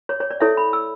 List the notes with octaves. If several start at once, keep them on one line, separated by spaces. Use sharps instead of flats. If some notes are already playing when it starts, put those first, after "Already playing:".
C#5
C#5
D5
E4 A4 C#5 E5
B5
E6